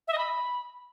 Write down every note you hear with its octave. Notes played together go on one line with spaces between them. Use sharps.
E5
D#5
B5